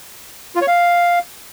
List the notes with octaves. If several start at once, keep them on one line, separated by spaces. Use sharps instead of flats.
F4
C#5
F5